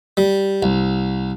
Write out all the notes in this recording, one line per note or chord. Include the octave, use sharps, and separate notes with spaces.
G3
C2